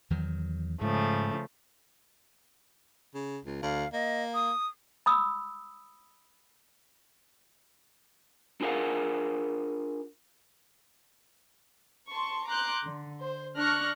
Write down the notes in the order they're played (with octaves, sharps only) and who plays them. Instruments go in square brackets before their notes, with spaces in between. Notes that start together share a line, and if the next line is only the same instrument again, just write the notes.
[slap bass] E2 D#3 F#3
[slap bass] G#2 [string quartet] C#3 F3 A3
[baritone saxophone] C#3
C#2
[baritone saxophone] D2 [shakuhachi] F5
[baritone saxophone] A#3 [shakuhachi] D#5
[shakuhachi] D#6
[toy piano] B5 D#6 E6
[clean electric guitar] D4 F4 G#4 A#4 F5 F#5
[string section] A5 C6 C#6
A#5 C6 D6 F#6 G6
D3
C5
D4 C#6 F6 F#6 A#6